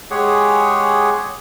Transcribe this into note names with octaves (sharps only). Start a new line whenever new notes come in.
G#3 G4 G#4 C#5 F#5